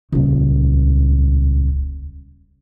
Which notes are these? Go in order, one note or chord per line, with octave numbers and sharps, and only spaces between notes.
D#1 C#2